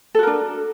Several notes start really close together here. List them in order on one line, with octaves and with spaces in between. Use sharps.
A4 F#4 A#4 D4